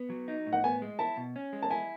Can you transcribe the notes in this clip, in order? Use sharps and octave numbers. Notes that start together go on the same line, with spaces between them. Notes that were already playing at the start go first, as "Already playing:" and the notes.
Already playing: B3
F#3
D#4
A2
F#5
B3 G#5
G#3
E4 A5
B2
C#4
G#3
A5
E4 G#5